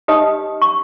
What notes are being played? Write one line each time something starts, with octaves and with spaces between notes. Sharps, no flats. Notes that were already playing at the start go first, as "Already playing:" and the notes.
D#4 G4 B4 D#5 D#6
C#6